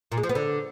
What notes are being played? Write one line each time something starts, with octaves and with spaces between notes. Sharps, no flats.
A#2
G#3
F3
B3
D3